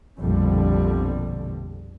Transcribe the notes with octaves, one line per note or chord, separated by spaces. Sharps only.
A#1 F2 B2 D3 G3